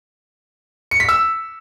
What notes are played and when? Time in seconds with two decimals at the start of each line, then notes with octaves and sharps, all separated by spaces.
0.91 C#7
1.00 B6
1.09 E6